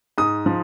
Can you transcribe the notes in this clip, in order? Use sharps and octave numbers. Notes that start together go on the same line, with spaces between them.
G#2 D#6
F3